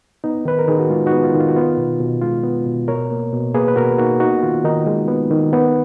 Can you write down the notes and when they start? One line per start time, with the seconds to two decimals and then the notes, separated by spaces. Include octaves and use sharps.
0.24 B3 D#4
0.45 D#3 B4
0.59 A#4
0.68 D#3 G#4
0.79 F#4
0.90 G#3 F4
1.06 D#4 F#4
1.13 B3
1.24 F4
1.34 D#3
1.40 F4
1.48 F#4
1.56 B3 F4
1.78 B2
2.00 B2
2.22 G#3 F4
2.44 B3
2.66 B2
2.88 B2 A#4 C#5
3.11 A#3
3.33 B2
3.54 A#3 G#4 B4
3.68 B4
3.76 B2 F#4 A#4
3.98 A#3 D#4 F#4
4.20 B3 D#4 F#4
4.43 D#3 F4
4.64 D#3 D#4
4.87 G#3
5.08 B3
5.31 D#3
5.53 B3